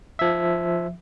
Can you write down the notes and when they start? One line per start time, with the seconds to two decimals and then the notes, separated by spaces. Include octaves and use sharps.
0.19 F3 E5